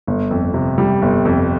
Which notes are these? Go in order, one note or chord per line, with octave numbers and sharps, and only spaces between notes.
G1
F2
C3
G3
G1
F2